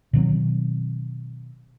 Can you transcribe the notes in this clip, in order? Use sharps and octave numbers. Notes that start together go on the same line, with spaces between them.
B2 D#3 F#3 C4